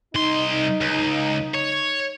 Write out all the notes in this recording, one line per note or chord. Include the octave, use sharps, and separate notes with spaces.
C2 D#4 C6
C#2
C#5